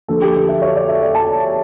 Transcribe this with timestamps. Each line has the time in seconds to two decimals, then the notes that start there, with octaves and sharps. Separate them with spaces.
0.08 D3 F3 A#3 A4
0.22 G4
0.35 G4
0.49 E5
0.62 C#5
0.76 D5
0.89 E5
1.02 D5
1.15 A5